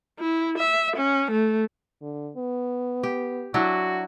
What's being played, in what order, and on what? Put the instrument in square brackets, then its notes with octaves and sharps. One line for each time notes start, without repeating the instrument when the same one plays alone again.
[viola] E4
E5
C#4
A3
[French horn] D3
B3
[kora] G4
[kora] F#3 D4 E4 [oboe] F#4